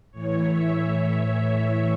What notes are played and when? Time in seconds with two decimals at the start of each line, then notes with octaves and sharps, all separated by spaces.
0.11 A2 E3 C#5
0.45 E5